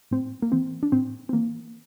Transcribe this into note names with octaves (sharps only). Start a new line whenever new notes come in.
A2 C4
A#3
E3 C4
D4
A2 C4
C4
E3 A#3